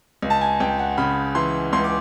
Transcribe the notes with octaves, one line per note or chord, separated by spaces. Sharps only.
C#2
A5
G#5
C#2 G5
F#5
C#3 B5
E3 C6
C#2 C6
D6